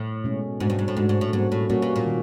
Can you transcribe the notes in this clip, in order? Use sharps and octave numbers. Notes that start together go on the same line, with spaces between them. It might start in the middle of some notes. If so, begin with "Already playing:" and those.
Already playing: A2
B2 G#3 C#4
G#2 A3 D4 F#4
G2
G#2
A2
G#2 A3 D4 F#4
G#2
A2
G#2 G3 A#3 C#4 F#4
A2
A#2 G3 A#3 C#4 F#4
B2
A#2
D#3